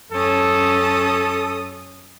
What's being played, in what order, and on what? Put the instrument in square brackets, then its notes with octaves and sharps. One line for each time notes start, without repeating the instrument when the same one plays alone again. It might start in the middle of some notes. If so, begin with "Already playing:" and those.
[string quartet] F#2 C#4 D#6 [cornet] A4